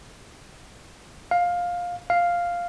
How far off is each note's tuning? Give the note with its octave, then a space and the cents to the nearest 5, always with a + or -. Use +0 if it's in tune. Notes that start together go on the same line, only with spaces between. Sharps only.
F5 +15
F5 +0